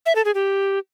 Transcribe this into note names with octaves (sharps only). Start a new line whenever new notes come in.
E5
A4
G#4
G4